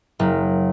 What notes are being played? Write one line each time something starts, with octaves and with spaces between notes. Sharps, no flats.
F#1